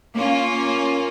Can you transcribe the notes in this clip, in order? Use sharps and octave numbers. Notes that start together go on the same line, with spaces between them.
A#3 C#4 F4